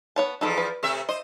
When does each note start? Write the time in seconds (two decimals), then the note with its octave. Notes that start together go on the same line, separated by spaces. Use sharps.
0.16 B3 C#5 A5
0.41 E2 F3 D#4 A4 B5
0.58 B4
0.83 C3 A3 E5
1.09 C5 D#5